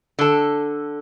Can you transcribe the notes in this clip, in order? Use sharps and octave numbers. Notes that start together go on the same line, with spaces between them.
D3 A4